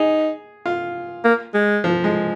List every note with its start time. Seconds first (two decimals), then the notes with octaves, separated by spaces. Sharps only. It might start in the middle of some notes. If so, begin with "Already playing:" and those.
Already playing: D#4 G#4
0.66 F4
1.24 A#3
1.54 G#3
1.84 F3
2.04 G#3